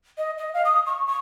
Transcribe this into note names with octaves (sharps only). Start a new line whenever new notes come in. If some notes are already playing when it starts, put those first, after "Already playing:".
D#5
D#5
F5
D#6
C#6
C#6